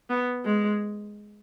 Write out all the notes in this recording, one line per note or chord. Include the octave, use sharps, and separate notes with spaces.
B3
G#3